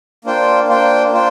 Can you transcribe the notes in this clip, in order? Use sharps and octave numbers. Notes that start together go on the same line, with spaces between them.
A#3 D4 F4 C5 G5
A#3 D4 F4 C5 G5
A#3 D4 F4 C5 G5